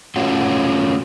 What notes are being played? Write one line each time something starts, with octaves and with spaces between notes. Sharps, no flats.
A3 C#4 F4 F#4